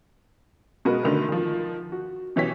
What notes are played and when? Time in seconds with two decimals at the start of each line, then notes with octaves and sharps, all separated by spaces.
0.85 B2 G#3 F#4 A#4 B4
1.03 D3 D#3 A3 B4
1.28 D#3 F3
1.92 F#4
2.36 B2 E3 G4 C#5 B6